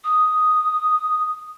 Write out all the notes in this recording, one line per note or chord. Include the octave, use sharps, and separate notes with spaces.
D#6